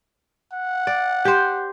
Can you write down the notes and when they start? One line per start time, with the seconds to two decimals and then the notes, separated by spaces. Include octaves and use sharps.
0.53 F#5
0.87 D5
1.25 G4 C5